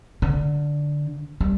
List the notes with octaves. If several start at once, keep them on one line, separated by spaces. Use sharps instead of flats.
D3
G3